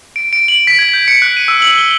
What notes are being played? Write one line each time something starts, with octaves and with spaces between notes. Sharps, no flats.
D7
D7
F#7
B6
G#6
G6
C#7
F#6
D#7
E6
F#7
G7